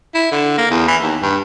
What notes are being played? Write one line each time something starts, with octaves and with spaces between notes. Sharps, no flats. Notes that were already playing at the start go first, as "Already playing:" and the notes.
E4
D3
A#3
E2
E3
D#2
G2